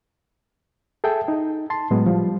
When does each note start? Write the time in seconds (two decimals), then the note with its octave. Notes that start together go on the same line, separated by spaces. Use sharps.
1.04 G#4 A4 E5 G5 A5
1.28 D#4
1.70 A5 C6
1.91 A2 F#3 G#3 B3
2.06 F3 G3